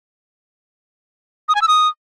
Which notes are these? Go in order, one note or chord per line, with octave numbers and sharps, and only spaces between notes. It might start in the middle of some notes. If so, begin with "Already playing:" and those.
D#6
G#5
E6
D#6